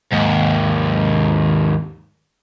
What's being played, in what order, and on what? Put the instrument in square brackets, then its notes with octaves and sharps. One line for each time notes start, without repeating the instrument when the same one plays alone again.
[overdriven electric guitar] D#2 G#2